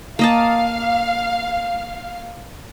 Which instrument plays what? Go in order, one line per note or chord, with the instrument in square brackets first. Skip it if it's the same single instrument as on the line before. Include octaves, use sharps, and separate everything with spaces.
[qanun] A#3 D#5 A5 [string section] F5